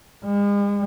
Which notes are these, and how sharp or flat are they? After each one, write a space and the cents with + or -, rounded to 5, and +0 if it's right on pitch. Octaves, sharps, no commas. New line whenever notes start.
G#3 -40